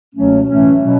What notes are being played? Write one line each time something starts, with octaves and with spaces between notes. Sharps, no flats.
C#2 B2 F#3 A3 C#4
A2 E3 A3 C#4
B2 F#3 C#4